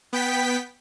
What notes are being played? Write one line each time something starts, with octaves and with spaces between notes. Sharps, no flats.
B3 G5 B6